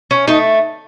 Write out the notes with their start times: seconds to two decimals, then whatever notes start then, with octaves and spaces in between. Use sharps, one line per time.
0.11 C#4
0.28 A3 D#4